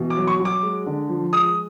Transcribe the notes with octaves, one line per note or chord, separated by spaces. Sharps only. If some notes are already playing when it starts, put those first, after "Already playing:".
Already playing: B2 E3
D6
F#3
C#6
F#3
D6
G#3
D3
F3
G#3 D#6